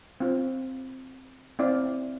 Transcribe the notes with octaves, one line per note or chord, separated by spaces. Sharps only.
C4 F4
C4 E4 D5 F5